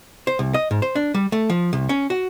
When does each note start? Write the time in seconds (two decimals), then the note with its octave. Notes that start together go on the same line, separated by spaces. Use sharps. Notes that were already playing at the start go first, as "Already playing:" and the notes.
0.27 C5
0.39 C2
0.54 D#5
0.71 G#2
0.82 C5
0.95 D4
1.14 G3
1.32 A3
1.50 F3
1.73 C2
1.89 C#4
2.10 F#4